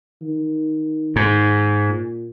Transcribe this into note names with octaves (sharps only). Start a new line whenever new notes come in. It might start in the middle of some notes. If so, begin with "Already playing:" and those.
D#3
G#2
A#2